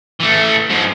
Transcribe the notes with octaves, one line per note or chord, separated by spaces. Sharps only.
E3 A3
G#2 F3